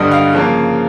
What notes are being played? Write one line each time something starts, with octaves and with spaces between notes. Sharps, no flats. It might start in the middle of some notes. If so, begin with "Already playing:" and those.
Already playing: G2 D3 G3 D#5
F5
C#3 F3 A#3